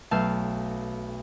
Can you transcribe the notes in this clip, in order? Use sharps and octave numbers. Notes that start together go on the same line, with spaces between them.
B1 A3 A4 F5 A5 G6